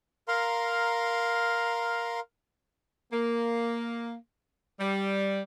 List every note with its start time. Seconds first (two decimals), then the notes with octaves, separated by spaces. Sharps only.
0.28 A#4 F5 A#5 C6
3.12 A#3
4.80 G3